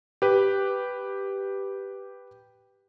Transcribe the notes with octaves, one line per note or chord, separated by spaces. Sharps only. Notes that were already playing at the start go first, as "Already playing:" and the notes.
G4 B4